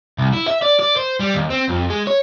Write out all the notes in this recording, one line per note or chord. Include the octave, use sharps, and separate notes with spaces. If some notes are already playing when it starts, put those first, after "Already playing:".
C2
E4
E5
D5
D5
C5
G3
D#2
C4
F2
G#3
C#5